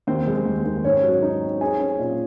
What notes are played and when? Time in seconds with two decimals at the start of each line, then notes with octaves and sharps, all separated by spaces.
0.07 D#2 C4 C5
0.27 G#3
0.46 D#2
0.65 D#2
0.84 G#2 C#4 C#5
1.03 F#3
1.22 D#4
1.42 C4
1.61 C#4 G#4 G#5
1.80 C#4
1.99 A#2